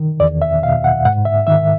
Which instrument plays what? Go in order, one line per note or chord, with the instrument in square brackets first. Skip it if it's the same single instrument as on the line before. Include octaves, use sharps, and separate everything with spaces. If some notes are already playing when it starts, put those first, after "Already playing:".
Already playing: [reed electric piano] D#3
E2 D5
E5
B2 F5
F#5
G#2 F#5
E5
D#3 E5